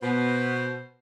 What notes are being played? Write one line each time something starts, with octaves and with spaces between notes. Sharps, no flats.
B2 B3 C5